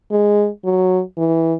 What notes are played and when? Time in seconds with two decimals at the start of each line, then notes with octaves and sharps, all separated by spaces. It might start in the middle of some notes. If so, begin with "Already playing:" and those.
0.11 G#3
0.65 F#3
1.17 E3